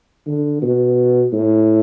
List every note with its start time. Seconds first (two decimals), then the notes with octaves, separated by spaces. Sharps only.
0.27 D3
0.62 B2
1.33 A2